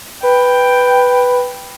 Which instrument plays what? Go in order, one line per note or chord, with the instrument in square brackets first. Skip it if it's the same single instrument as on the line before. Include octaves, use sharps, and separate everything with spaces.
[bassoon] B4 [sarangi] G5